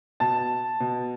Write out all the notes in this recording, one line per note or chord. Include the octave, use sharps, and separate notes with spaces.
B2 A5
B2